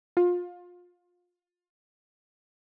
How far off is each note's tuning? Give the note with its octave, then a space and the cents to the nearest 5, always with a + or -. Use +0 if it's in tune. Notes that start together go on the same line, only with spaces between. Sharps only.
F4 +25